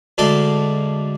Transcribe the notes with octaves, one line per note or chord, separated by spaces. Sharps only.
D2 G#2 D4 A4